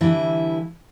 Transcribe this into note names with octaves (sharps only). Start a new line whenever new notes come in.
D3 E3 G3 E4